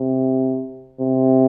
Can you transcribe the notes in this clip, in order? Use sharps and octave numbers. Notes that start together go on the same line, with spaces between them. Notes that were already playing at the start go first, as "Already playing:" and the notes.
Already playing: C3
C3